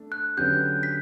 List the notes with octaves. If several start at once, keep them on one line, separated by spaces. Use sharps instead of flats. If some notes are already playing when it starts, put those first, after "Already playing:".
Already playing: A3 D4
F#6
D3 F#3 C#4 G4 B4 G6
B6